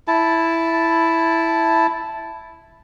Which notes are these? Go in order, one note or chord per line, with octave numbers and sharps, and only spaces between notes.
E4 A5